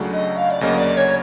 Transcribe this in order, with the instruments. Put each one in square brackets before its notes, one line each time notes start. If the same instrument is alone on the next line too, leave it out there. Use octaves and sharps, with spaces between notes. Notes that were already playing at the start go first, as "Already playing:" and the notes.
Already playing: [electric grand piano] C#2 C#3 F#3 A3 D4
[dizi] D#5
F5
D5
[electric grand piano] D2 C#3 F#3 A#3 [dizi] D#5
[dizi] D5
C#5